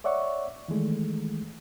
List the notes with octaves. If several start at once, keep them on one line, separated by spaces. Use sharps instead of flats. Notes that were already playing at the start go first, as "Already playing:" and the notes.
C#5 D5 E5 F#5 C#6
D#3 E3 G#3 A3